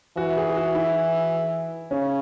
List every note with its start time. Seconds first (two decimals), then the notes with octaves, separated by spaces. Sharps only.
0.17 E3 F#4
0.37 G#4
0.49 G#4
0.56 F#4
0.75 E4
1.91 C#3 C#4